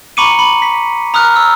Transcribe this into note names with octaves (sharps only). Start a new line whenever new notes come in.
A#5 B5 C#6 D6 C#7 D#7
B5
B6
A#5 D#6 F6 F#6
E6